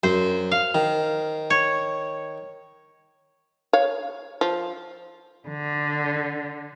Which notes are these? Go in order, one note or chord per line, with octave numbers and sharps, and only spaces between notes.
F#2 C5
F5
D#3
C#5
C#5 F5
F3
D3